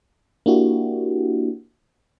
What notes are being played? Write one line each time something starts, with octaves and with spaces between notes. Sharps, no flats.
A#3 D4 E4 F#4 G4